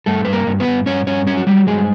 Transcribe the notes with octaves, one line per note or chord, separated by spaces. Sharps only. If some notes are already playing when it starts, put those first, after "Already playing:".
G2 A3 A4
G2 B4
A#3 A#4
G2
B3 B4
G2
G2 C#4 C#5
G2 C#4 C#5
F#3 C#4 C#5
F#4
F#3 G3 G4
G2 G#3 G#4